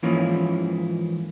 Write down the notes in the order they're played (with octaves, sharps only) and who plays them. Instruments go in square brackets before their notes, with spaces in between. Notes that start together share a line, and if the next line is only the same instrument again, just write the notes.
[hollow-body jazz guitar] G#2 E3 F3 A#3 C#4